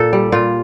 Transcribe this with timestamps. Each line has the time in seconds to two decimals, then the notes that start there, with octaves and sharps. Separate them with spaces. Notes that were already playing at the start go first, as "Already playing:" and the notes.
Already playing: A#2 A4
0.13 G3
0.32 A#2 F4